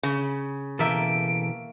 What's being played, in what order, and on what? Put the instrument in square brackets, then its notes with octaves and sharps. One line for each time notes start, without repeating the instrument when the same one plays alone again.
[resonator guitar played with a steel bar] C#3
[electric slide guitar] B2 E3 A4 [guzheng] A#3 E5 G5 [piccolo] D7